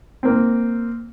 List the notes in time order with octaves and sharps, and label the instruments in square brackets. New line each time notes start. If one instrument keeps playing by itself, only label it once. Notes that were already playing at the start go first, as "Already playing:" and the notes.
[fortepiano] A#3 C4